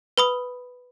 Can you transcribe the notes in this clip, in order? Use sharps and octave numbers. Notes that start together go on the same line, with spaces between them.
B4 B5 D#6